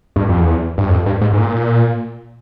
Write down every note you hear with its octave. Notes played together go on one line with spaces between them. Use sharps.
G2
F2
E2
G2
F2
G2
G#2
G#2
A#2